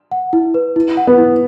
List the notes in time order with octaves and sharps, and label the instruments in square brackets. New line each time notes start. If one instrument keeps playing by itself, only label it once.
[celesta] F#5
E4
B4
E4
F#5
[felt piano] B3
[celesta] E4